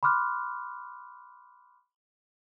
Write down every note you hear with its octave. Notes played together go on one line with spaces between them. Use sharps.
B5 C6 D6 F6 F#6